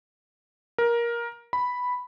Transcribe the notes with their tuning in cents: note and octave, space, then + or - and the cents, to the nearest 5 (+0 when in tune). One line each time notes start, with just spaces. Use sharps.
A#4 +15
B5 +0